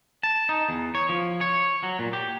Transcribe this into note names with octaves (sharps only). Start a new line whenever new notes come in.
A5
D#4
E2
C#5
F3
C#5
F#3
A#2
G4